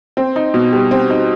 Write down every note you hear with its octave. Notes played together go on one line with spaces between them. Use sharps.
C4
D#4
B2
G3
C4
D#4